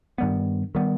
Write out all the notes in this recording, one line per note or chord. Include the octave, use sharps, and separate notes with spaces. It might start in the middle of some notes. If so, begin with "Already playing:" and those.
G2 D#3 G3 B3
D#3 G3 B3